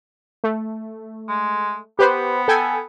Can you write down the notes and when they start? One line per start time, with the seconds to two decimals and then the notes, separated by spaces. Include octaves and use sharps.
0.44 A3
1.28 G#3
1.99 B3 G4 B4 C5
2.48 A4 G5 G#5